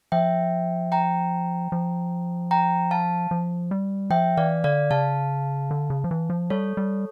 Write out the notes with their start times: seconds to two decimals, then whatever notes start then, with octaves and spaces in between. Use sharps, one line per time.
0.12 F3 E5 G5
0.92 G5 A#5
1.72 F3
2.51 G5 A#5
2.91 F5 A5
3.31 F3
3.71 G3
4.10 F3 E5 G5
4.37 E3 D5 F5
4.64 D3 D5 F5
4.91 C#3 F5 A5
5.71 D3
5.90 C#3
6.04 F3
6.11 E3
6.30 F3
6.50 G3 A4 C#5
6.77 G3